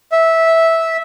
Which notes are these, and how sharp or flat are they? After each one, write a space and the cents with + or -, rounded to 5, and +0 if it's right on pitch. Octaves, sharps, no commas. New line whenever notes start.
E5 -10